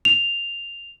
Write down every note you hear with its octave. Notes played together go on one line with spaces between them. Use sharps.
F7